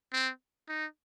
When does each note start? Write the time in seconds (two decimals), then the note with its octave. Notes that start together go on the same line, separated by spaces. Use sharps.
0.13 C4
0.69 D#4